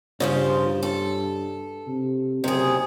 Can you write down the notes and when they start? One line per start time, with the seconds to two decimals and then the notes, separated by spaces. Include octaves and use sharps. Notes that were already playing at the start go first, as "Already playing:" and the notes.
0.20 G2 C#3 F3 F4
0.83 A4
1.88 C3
2.44 F#1 C3 G#4